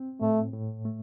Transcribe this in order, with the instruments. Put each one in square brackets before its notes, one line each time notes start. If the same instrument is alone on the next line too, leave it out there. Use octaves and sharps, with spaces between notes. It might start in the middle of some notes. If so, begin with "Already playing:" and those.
Already playing: [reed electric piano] C4
[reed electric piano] A2 [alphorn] A3
[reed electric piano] A2
A3